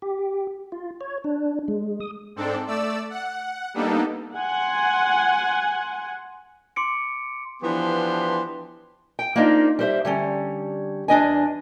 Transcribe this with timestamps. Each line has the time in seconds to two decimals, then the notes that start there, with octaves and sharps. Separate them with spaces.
0.02 G4
0.72 F4
1.01 C#5
1.24 D4
1.68 G#3
2.00 D#6
2.36 G#2 C4 D4 A4
2.67 A3 D5 E6
3.10 F#5
3.74 G3 A#3 B3 D4 D#4 A4
4.35 F#5 G#5 C6
6.76 C6 D6 C#7 D7
7.62 E3 F3 B3 D4 G4 C6
9.19 G5
9.36 A#3 C4 D4 D#4 F4
9.79 G3 C5 E5
10.05 D3 G3 C#4
11.08 E2 D4 D#5 G#5